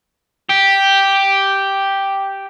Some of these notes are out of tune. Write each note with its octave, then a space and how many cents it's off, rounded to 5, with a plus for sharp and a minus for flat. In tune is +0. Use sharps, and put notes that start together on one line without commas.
G4 +0